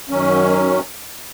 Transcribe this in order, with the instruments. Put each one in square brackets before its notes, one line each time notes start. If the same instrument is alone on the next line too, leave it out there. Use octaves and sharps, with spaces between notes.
[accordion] F#2 D#3 F#3 C#4